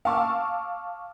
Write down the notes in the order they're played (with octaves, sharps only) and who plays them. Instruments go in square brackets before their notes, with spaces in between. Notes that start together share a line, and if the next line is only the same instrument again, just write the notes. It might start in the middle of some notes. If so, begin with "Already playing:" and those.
[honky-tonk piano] F5 A5 C#6 D6 E6